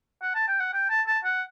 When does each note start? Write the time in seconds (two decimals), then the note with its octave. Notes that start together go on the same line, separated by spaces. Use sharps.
0.22 F#5
0.35 A5
0.48 G5
0.60 F#5
0.73 G5
0.90 A5
1.07 A5
1.24 F#5